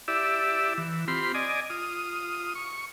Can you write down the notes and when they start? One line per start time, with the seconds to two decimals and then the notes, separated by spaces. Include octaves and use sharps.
0.08 E4 G4 D5 E5
0.78 E3
1.08 C4 F4 G4 B5 C6
1.34 D5 D#5 G#5
1.70 F4 D#6
2.55 C#6